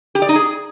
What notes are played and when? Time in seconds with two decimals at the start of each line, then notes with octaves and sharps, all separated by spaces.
0.15 G4
0.22 D5
0.29 D#4
0.36 G#4